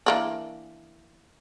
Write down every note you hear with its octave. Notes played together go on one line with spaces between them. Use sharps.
E3 A#3 D4